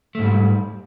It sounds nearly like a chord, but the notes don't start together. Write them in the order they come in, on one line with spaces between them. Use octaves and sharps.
A3 G#2 G3